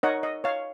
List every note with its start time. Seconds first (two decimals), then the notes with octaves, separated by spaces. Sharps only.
0.03 D#4 A#4 C#5 D#5 F#5
0.23 D#5
0.44 C#5 F5